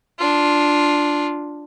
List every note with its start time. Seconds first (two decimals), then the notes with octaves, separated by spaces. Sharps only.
0.19 D4 F4